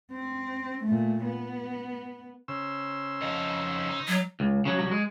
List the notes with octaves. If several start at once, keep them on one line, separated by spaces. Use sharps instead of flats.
C4
A#2 A3
B3
C#3 C5 E6
F2 D#4
D#4
F#3
C#2
C#3 F#3
C2 F#3
G#3